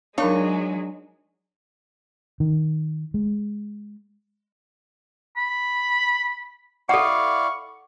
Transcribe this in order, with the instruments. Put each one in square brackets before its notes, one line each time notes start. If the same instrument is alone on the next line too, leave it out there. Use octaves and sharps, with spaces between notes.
[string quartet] F#3 G#3 [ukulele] D4 [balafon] D#4 A#4 F5 [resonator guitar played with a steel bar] C#5
[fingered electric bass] D#3
G#3
[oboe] B5
[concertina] E4 D5 F5 [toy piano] A4 F#5 [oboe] C#6